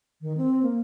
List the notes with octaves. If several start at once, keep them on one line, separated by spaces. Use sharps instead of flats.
D#3
C4
A#3